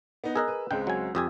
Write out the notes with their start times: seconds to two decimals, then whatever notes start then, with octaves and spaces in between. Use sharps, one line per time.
0.24 B3 D#4
0.35 G#4 A#4 D#5 E6 F#6
0.48 B4
0.71 C#2 G#3 C4 G5
0.87 F#3 G#5
1.15 F2 G4 G#5 D#6 E6